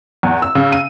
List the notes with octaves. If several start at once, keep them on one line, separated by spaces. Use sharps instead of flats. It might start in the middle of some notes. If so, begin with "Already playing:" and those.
E2
E6
C#3
D#7